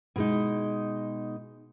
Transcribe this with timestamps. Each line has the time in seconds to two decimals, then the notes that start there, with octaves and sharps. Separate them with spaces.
0.16 B2 G#3 D#4